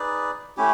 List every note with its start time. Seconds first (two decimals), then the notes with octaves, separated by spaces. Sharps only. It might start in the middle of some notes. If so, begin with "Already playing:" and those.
Already playing: D#4 G#4 B4 D5
0.57 A3 C#4 E4 G4